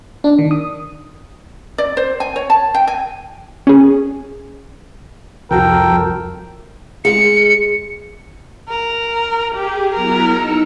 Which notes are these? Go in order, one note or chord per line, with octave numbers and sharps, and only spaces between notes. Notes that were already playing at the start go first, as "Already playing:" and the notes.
D4
D#3
D#6
D5
C5
G#5
C#5
A5
G5
G#5
C#4 G#4
C2 F2 F#4 A4 A#4 G5
G#3 C#7
A#4
G4 G#4
F#3 B3 E4 A#4
D#4 E6 C#7